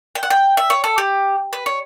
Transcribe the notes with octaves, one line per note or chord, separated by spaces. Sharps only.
G5
F#5
G5
E5
C#5
A4
G4
B4
C#5